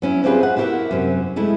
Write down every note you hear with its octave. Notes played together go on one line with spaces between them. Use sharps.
F#3 C#4 E4
C4 D4 F4 G4 G#4 B4
F#5
E4 F#4 G4 A4 A#4 E5
F#2 C3
G#3 A3 E4